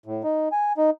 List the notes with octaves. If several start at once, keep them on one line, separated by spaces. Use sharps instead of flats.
A2
D#4
G#5
D#4